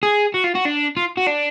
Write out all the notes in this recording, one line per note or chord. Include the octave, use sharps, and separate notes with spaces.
G#4
F#4
F4
F#4
D4
F4
F#4
D4